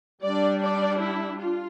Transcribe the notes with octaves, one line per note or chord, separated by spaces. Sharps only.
G3 D4 D5
D5
E4
F4